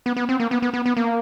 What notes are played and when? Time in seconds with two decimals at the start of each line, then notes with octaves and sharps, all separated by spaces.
0.06 B3
0.17 B3
0.29 C4
0.40 A#3
0.51 B3
0.62 B3
0.74 B3
0.86 B3
0.97 A#3